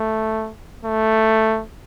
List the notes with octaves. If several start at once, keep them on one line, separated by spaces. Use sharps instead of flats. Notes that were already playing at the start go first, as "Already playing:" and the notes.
Already playing: A3
A3